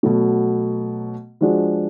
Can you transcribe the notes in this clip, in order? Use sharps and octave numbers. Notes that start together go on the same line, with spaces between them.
B2 F#3 A3
F3 G#3 D4 F#4